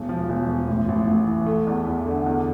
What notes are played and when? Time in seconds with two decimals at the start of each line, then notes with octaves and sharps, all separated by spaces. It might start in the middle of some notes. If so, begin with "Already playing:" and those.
Already playing: E1
0.09 F3
0.29 E1
0.49 E1
0.68 A1
0.88 A1
1.07 A1
1.27 E3
1.46 A3
1.67 E2
1.87 E2
2.05 D3
2.26 E2